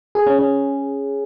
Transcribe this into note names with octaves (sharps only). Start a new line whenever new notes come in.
G#4
C#4
C#4